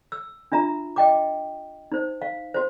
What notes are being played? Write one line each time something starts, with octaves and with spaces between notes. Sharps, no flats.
E6
D4 F4 E5 A#5
D#5 G5 D6
D#4 C5
F5
F#4 C5